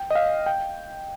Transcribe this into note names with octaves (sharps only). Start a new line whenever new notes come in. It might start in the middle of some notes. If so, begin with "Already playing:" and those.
Already playing: G5
D#5
F5
G5